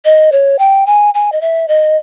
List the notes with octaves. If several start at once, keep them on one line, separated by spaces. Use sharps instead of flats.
D#5
C#5
G5
G#5
G#5
D#5
E5
D#5